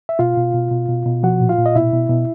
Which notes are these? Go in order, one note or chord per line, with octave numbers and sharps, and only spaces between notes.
E5
B2 F4 F5
B2
B2
B2
B2
B2
F3 F#4 F#5
A#2
F4 F5
A#2
D#5
B2 E4 E5
B2
B2